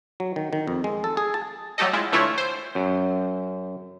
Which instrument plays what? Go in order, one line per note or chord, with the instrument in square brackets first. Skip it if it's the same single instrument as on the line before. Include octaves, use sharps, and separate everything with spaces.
[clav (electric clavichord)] F#3
D#3
D#3
F2
G#3
A4
G#4
A5
[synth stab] F#3 G3 A3 G4 A4 D#5
G#3 E4 F4
D3 E3 A3 E4 F4 C#5
C5
[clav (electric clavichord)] F#2